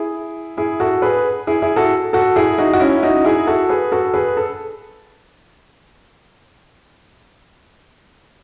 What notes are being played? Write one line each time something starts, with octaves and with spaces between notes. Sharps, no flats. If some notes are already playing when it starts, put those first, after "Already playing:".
Already playing: E4 G#4
E4 G#4
F#4 A4
G#4 B4
E4 G#4
E4 G#4
F#4 A4
F#4 A4
E4 G#4
D#4 F#4
F#4
C#4 E4
D#4 F#4
E4 G#4
F#4 A4
G#4 B4
F#4 A4
G#4 B4
A4